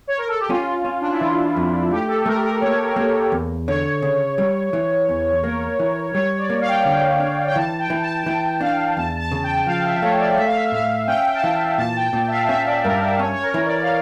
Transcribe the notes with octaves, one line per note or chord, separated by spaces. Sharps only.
C#5
A#4
A4
G4
C#4 F4
C#4
D4
E4
E3 F4
F2
A3 G4
A4
A3 A#4
A#4
A#3 C#5
A#4
A#3 C#5
E2
D3 C#5
C#3
G3
E3
E2
A#3 A#4
E3
G3 C#5
D5
A#3
F5
G5
F5
D3 G5
D4
G5
E3 A5
G5
E3
A5
A5
E3 G5
D4 F5
E2 A5
A5
C#3
G5
F3 F5
E5
A3 C#5
D5
A3 E5
F5
E5
A2 F5
C#4 G5
A5
E3 G5
A#2 A5
G5
A#2
E5
F5
C#4 E5
D5
G2 A#4
A#4
C#4 C#5
C#5
A#4
E3
D5
F5